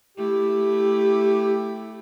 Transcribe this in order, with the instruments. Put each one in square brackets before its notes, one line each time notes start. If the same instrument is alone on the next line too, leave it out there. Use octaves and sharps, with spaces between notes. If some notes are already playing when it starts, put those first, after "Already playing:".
[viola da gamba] A3 E4 [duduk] G4